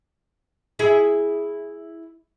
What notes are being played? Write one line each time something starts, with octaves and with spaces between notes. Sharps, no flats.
E4 G#4 E5